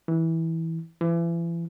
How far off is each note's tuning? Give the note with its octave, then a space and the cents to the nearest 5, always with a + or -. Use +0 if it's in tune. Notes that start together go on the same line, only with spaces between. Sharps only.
E3 -15
E3 +35